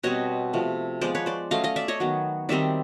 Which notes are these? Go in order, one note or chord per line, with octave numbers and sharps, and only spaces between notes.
B2 G3 C4 C#5 D#5
C3 F3 A3
F3 G#3 B3 C5 D5
B4 C#5
C5 D5
F#3 A3 C#4 D#5 F5
D#5 F5
D5 E5
C#5 D#5
D#3 F#3 B3
D#3 G3 C4 D#4 D5 E5